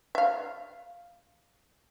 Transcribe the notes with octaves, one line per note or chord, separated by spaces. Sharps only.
E5 F5